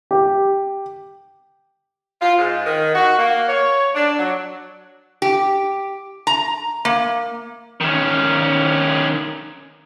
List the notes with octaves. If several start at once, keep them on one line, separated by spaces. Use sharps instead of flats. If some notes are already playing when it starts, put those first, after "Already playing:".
G4
F4
G#2
D#3
F#4
A#3
C#5
D4
F#3
G4
A#5
A#3
D#3 C#4